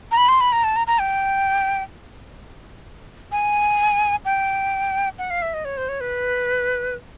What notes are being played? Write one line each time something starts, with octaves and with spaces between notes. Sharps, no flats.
A#5
B5
C6
B5
A#5
A5
A#5
A#5
G5
G#5
G5
F#5
F5
E5
D#5
C#5
C5
C#5
B4